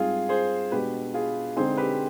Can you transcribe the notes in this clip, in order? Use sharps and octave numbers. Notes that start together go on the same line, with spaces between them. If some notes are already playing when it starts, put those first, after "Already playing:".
Already playing: G#2 G3 C4 D#4 F4 G#4
G#4 C5
B2 G#3 D4 G4 B4
F4 G#4
D3 G#3 C4 D#4 G#4 C5
G4 B4